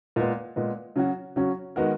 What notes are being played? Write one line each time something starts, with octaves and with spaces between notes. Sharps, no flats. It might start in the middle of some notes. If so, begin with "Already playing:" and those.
A#2 G#3 B3
A#2 G#3 B3
C#3 F#3 C#4 F#4
C#3 F#3 C#4 F#4
D#3 G#3 B3 F#4 A#4